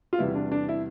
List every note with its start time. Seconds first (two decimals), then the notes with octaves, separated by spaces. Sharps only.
0.13 F4
0.18 E2 C3 G3 B3 E4
0.35 D4
0.52 D4
0.69 E4